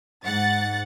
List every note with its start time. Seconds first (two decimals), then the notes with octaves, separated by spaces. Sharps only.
0.24 G#2 F#5 A6